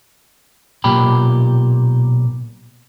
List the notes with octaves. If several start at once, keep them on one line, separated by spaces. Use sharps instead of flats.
B1 A#2 G4 B5